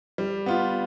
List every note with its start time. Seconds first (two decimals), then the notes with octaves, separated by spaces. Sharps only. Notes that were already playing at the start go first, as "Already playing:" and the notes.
0.18 G3
0.46 B3 F4